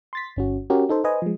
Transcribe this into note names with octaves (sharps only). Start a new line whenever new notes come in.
C6 A6 B6
G1 C#4 F#4
C#4 F#4 G4 A#4
D#4 A4 C5
B4 C5 D#5 G#5
F3 G#3